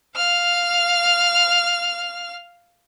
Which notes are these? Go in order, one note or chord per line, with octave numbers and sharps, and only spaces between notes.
F5 F6